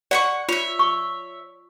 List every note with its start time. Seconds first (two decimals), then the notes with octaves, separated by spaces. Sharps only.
0.11 D5 F#5 B5 C#6
0.49 F4 C#5 E5
0.79 C#6